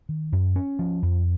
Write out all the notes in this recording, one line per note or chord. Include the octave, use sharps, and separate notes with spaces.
D#3
F#2
C#4
F3
F2